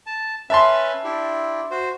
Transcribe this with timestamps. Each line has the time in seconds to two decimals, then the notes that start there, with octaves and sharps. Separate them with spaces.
0.06 A5
0.50 C#4 B4 E5 A5 C6
1.04 D4 E4 G4
1.71 F#4 C5